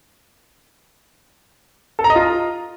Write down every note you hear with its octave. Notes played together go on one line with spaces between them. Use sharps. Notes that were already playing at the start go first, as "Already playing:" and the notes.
A4
A#5
D#5
F4